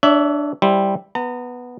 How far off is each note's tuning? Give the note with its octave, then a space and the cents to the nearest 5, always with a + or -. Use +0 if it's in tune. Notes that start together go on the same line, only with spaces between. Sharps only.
D4 +0 C#5 +35 E5 +0
G3 +0 E4 +0 C5 +5
B3 +0 A#5 -40